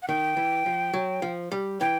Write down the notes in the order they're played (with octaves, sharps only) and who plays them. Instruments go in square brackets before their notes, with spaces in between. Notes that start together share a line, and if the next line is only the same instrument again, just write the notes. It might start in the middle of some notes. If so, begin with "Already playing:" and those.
[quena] F#5
[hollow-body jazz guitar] D#3 [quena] G5
[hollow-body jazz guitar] E3
F3
F#3
F3
G3
[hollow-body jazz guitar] E3 [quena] G5